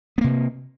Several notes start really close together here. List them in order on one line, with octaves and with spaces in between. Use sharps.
B3 A#3 C3